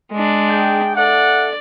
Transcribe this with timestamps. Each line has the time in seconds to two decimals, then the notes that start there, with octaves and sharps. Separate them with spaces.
0.12 G#3 D4
0.50 G#4 G5
0.96 A4 D5 E5 F#5